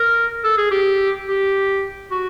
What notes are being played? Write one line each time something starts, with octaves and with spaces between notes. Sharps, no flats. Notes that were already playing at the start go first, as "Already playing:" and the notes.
Already playing: A#4
A4
G#4
G4
G4
F#4